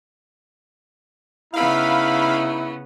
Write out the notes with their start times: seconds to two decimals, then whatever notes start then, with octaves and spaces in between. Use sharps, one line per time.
1.54 C#3 B3 D#4 E4 E5 F5 B5